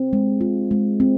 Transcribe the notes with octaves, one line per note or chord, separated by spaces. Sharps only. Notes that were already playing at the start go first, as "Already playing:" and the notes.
Already playing: C4
G#3
F4
G#3
C4